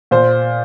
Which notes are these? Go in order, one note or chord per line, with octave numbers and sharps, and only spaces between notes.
A#2 C5